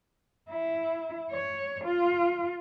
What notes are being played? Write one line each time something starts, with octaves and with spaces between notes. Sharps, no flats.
E4
C#5
F4